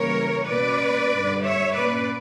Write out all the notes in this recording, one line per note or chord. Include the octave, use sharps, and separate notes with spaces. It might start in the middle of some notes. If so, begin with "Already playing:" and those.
Already playing: C#3 E3 G3 A#3 A#4 C#5
B2 A#3 C#4 B4 D5
G2 D3 G3
C#5 E5
A#2 A#3 C#4 B4 D5